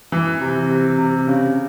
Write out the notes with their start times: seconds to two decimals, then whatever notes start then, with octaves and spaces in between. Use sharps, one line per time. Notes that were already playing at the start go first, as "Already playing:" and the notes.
0.12 E3
0.41 C3
0.70 C3
0.98 C3
1.27 C#3